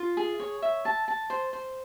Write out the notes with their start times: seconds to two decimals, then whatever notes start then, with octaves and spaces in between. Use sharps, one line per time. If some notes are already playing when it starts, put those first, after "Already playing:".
Already playing: F4
0.17 G#4
0.39 C#5
0.62 E5
0.85 A5
1.08 A5
1.30 C5
1.53 C5